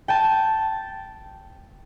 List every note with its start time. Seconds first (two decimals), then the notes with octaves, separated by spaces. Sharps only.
0.08 G5 A5